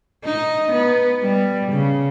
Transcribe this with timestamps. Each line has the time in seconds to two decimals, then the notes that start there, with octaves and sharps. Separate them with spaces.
0.25 D#4
0.72 B3
1.23 G3
1.72 C#3